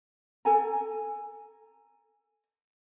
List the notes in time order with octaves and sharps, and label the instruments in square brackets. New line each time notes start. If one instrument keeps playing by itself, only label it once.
[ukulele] A4 G#5 A#5